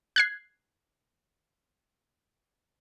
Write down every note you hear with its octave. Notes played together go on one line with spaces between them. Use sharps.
F#6 G#6 C7